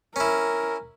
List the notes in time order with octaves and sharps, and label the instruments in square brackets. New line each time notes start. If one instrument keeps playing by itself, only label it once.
[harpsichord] C#4 E4 [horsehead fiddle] A#4